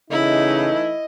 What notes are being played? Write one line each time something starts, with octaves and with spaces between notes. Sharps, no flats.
C#3 E3 A3 D#4 E4 D#5